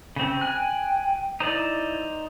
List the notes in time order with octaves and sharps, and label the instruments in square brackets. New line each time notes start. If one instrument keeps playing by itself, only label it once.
[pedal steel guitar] C#3 C4
[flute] G5 [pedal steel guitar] G#5 F#6
[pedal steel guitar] D#4 C5 D5 [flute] E4